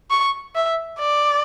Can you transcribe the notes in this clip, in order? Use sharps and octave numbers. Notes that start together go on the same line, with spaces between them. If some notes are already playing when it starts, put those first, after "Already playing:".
C#6
E5
D5